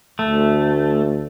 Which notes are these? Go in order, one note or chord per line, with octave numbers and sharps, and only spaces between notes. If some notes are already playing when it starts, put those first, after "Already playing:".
D2 A3